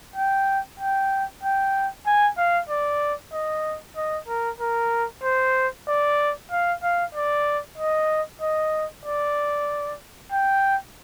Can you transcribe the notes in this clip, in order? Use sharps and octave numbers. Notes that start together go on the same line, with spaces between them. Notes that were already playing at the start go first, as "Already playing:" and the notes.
G5
G5
G5
G#5
F5
D5
D#5
D#5
A#4
A#4
C5
D5
F5
F5
D5
D#5
D#5
D5
G5